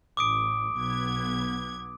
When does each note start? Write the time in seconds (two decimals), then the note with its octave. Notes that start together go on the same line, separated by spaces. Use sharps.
0.17 A1 D6 D#6 D7
0.75 B1 B3 G#6